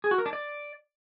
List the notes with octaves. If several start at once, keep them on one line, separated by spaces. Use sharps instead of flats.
G#4
F#4
A#4
D4
D5